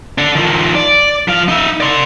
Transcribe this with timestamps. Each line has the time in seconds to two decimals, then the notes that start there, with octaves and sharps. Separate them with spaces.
0.18 D4 A4
0.35 D#3 F3
0.75 D5
1.28 F3 F5
1.48 D#4 E5
1.81 D5 C6